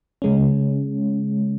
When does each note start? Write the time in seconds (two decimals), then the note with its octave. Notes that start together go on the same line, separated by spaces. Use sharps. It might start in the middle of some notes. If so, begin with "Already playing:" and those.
0.22 C#3 G#3 C#4